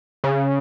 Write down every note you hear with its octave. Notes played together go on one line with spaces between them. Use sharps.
C#3